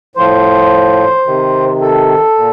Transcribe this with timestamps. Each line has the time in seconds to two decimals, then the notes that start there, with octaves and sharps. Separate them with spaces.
0.16 A2 F3 C5
1.26 C3 D#3
1.81 A4
2.36 A#2